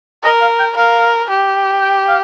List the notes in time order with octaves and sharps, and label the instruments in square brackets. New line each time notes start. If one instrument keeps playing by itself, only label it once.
[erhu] A#4 [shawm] D#5
[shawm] F5
G5
[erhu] A#4 [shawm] F5
[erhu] G4
[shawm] G5
F5